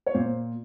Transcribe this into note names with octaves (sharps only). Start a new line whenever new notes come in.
C#5
A#2 C5